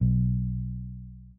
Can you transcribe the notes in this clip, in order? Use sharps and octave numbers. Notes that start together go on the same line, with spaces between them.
B1